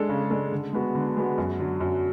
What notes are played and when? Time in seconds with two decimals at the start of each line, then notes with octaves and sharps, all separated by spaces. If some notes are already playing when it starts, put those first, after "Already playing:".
Already playing: G#3 D4 A4
0.09 C#3
0.30 G#3 D4 A4
0.52 D3
0.73 G#3 B3 F#4
0.95 D3
1.16 G#3 B3 F#4
1.38 F#2
1.59 D3 F#3
1.80 F#2